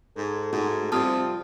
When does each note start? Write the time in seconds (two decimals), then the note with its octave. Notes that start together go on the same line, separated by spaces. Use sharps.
0.17 G#2 A4
0.53 G#2 A3 F#4
0.92 C3 F3 G3 F4 A5 D#6 F6